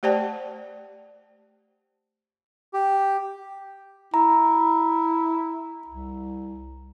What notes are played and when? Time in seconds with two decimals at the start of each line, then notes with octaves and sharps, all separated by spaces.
0.03 A3 G4 C5 D5 G5 A5
2.73 G4
4.14 E4 A#5
5.87 C2